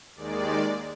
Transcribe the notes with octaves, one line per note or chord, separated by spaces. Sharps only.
D#2 D#3 G#3 D5